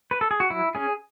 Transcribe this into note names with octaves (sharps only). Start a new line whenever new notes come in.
B4
A4
G#4
F#4
F#3 E4
C#4 G#4